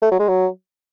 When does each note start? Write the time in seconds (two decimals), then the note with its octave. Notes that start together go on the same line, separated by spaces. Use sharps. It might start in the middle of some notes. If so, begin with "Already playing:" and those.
0.02 A3
0.12 F#3
0.20 G#3
0.29 F#3